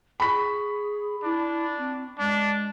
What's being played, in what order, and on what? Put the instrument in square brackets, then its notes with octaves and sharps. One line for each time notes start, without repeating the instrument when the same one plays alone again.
[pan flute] G#4 [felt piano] B5 C#6 B6
[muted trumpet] D4 [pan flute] E4
[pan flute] C4
[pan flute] G#3 [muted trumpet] D4